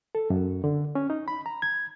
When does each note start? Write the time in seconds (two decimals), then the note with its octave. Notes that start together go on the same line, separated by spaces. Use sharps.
0.15 A4
0.30 F#2
0.64 D3
0.95 C#4
1.10 D#4
1.28 B5
1.46 A#5
1.62 G#6